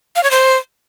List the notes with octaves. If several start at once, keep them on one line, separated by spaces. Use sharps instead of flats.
F5
C#5
C5